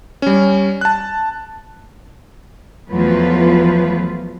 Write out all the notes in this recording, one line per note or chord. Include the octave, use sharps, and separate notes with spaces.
G3 C#4
A5 F#6
E2 F3 F#3 A3 F4 B4